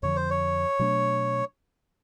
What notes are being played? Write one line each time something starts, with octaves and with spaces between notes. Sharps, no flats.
F2 D3 F3 C#5
C5
C#5
B2 F#3 A3 D4